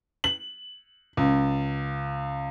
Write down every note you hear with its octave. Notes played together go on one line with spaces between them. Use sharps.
F#7
C#2